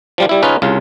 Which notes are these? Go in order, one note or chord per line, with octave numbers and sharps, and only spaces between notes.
F3 G3 F4
G3 E4
C#3 C#4 D#4 F4 B4
C2 C#3 F4